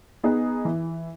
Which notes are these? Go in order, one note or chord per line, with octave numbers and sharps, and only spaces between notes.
B3 D#4 G#4
E3